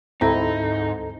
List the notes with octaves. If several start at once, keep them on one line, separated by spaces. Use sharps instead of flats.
D2 G#2 C4 D#4 E4 A4 A#5